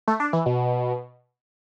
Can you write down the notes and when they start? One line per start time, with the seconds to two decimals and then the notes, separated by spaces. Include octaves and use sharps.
0.08 A3
0.20 D4
0.33 E3
0.46 B2